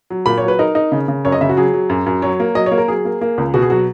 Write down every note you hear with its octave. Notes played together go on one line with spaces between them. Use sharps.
F#3
A#2 B5
F#3 C#5
B4
D#4 A#4
D#4
C#3
C#3
F#2 C#5
D#5
C#3 E5
F#4
F#3 G#4
F#3
F#2
F#2
F#3 C#5
A#3
F#3 D#5
C#5
A#3
A#4
F#3 G#4
A#3
A#3
C#2
B2 F#4
G#4
F#3 F#4